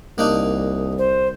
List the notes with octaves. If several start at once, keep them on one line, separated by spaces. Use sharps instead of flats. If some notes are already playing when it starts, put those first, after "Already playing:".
C2 A#3 D4 D#4
C5